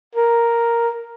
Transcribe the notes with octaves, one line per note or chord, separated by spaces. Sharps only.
A#4